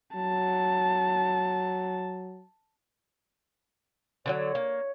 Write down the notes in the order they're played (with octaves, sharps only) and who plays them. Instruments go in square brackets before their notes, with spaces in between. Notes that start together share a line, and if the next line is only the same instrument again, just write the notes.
[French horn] F#3 [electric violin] A5
[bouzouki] D3 F3 F#3 [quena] C#5
[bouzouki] A#3